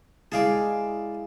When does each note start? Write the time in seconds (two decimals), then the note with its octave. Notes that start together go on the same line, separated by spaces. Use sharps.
0.32 G#3 E4 G#4 D5 F5 A5